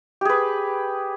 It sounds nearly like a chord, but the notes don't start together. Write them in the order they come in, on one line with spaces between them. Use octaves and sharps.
G4 G#4 B4